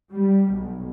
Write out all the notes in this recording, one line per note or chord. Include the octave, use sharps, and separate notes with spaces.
G3
B1